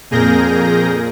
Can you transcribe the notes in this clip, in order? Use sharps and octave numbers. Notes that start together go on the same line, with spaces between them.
F2 A#2 G#4 A#4 G6 A#6